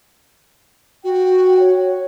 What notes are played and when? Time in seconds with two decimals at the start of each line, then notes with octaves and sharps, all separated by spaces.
1.04 F#4 G5
1.60 C#5